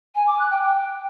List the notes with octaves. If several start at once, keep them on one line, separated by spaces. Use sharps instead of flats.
G#5
D6
F#6
G5
G5